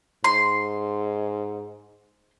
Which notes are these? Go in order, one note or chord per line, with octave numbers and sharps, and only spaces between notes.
G#2 C6